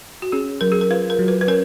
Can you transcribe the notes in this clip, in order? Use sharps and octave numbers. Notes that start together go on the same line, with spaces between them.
F#4
C#4 G#4
F#3 A#4
G#4
A#4
F4 B4
A#4
F#3
B4
B4
C#4 A#4